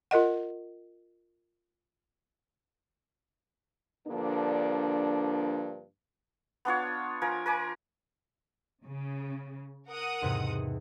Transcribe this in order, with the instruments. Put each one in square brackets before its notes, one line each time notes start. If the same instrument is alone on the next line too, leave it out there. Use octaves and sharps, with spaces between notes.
[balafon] F4 A#4 D#5 F#5
[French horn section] G2 D3 F3 A#3 D4
[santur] B3 D4 F4 C#5
F3 A#4 G#5
A#4 G#5 D6
[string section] C#3
A#4 F#5 D#6
[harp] E2 G#2 C3